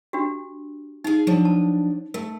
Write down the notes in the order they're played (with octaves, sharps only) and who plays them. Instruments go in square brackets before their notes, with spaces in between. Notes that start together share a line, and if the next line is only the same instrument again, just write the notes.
[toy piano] D4 F#4 G4
[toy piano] D#4 [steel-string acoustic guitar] G#4 F5
[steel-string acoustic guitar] F3 F#3 D4
[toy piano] A5
[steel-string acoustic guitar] A3 [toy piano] A#4